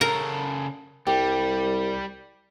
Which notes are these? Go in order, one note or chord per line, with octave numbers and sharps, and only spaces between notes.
C#3 A4 A#4 A#5
C2 G3 G4